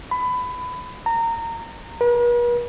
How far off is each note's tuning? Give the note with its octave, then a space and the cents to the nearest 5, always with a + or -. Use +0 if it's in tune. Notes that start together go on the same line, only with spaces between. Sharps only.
B5 +20
A#5 -25
B4 -45